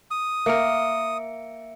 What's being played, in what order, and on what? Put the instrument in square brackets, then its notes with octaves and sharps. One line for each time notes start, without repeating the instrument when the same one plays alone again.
[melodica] D#6
[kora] A#3 A#4 [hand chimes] E5 C#7 D7